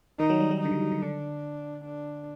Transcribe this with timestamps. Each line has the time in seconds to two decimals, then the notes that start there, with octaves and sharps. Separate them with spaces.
0.20 D#3 D#4
0.30 F#3
0.40 G3
0.51 G3
0.61 D3 D#4
0.71 D#3
0.82 D#3
0.92 D3
1.02 D3 D4
1.85 D4